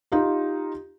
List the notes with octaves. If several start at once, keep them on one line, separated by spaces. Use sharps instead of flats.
D#4 F4 G4